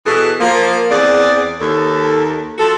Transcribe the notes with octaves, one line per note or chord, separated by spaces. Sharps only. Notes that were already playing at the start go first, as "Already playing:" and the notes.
B2 E3 G#4 A4
F3 A#3
E2 C4 G#4 D5
D#2 A4
F3 F#4 A4